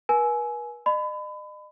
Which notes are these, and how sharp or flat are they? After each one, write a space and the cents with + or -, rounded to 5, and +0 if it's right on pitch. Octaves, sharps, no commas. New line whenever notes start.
B4 -45 G#5 +25
D#5 -40 B5 +30